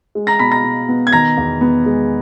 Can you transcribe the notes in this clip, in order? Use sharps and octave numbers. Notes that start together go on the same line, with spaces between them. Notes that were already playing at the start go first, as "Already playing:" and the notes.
G#3
A#5 A#6
B2 B5 B6
A#5 A#6
B2
B3
G#6
D#3 A#5 A#6
E2
B3
G#3